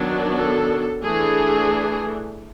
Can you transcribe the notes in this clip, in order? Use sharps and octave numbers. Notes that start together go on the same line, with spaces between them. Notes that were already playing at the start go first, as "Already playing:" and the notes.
Already playing: D#3 F#3 B3 D4
A4
E3 A3 D4 G#4